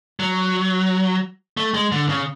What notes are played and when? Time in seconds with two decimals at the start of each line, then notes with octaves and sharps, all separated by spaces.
0.20 F#3
1.57 A3
1.74 G#3
1.92 D3
2.09 C#3